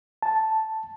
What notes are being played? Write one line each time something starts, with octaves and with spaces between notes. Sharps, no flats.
A5